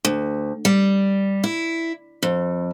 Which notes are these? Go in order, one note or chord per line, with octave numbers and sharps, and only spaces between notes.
D2
G3
E4
F2